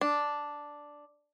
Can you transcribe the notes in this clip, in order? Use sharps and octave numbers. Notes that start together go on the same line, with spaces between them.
D4